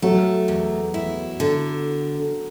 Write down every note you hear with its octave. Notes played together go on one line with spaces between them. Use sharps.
F#3 A3
E2
E4
D3